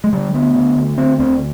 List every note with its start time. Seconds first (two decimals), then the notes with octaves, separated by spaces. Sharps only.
0.04 G#3
0.13 D3 G3
0.34 D2 B3
0.55 D3
0.76 D2
0.97 D3 C4
1.19 D2 C4